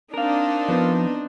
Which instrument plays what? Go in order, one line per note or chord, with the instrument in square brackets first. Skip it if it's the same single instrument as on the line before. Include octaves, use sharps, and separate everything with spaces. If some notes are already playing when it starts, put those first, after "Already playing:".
[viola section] C4 D4 D#4 [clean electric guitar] A#4 F5
[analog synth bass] F3 [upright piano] B3